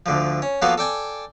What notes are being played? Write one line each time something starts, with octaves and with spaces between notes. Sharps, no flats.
D2 D3 F3
C#4
F3 A#3 B3 F#4 A4 F5
A4 D5 G5 G#5